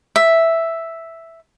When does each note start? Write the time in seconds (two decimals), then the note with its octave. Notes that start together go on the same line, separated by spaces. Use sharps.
0.16 E5